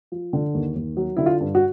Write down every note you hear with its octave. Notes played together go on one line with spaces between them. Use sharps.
F3
D3
D#2
D#2
F#3
D3 E4
F4
G2
F#4